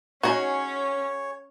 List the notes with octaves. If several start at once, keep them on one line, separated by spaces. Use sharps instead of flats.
C#4 D#4 F#4 G#4 C#5 F#5 G#5